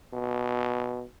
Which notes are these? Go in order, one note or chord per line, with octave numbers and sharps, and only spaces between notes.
B2